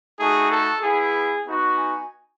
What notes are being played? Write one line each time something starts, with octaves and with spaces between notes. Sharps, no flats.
A3 D#4 F#4 G#4
A4
B3 E4 G#4
B3 D#4 F#4
G#5